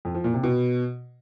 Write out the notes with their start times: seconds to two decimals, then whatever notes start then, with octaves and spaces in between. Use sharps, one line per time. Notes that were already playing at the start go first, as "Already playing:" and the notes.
0.05 F2
0.15 F3
0.24 A#2
0.34 C3
0.44 B2